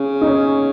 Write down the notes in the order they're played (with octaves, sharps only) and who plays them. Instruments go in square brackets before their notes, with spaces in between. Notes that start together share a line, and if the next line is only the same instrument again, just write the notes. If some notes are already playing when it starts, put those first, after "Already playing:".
Already playing: [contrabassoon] C#3
[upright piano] D#4
C#4